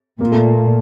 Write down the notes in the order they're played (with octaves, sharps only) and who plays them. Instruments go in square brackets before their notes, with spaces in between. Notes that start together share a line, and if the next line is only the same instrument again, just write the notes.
[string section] A#2 [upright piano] A#3
[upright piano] A3